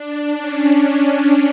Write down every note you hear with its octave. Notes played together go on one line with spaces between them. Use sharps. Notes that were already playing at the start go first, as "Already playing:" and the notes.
Already playing: D4
C#4